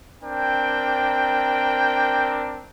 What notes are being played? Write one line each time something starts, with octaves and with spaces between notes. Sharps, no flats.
C4 D4 A#4 G5